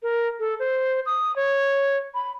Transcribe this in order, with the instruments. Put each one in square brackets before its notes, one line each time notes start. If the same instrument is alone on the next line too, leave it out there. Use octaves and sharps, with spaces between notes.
[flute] A#4
A4
C5
D#6
C#5
B5